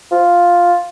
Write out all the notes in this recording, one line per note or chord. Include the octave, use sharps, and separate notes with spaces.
F4